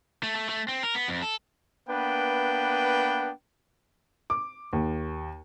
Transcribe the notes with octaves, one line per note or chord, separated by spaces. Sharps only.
A3
A3
A3
C4
A#4
B3
F2
A4
A#3 B3 D4 B4 G5
D6
D#2